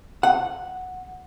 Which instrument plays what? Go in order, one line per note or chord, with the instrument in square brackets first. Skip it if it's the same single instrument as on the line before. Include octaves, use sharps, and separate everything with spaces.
[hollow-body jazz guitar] F#5